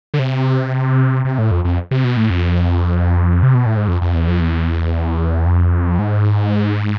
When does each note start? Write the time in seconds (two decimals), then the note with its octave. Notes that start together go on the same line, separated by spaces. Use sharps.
0.14 D3
0.19 C3
1.25 C3
1.38 A2
1.51 F2
1.65 F2
1.91 C3
2.04 B2
2.17 A2
2.30 F2
3.43 C3
3.55 B2
3.66 A2
3.77 G#2
3.88 F2
4.02 F2
4.15 E2
4.28 F2
4.40 E2
5.46 F2
5.99 G#2